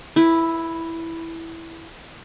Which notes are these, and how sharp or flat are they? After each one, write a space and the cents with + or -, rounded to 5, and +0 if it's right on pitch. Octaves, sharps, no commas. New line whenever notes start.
E4 +0 B4 -30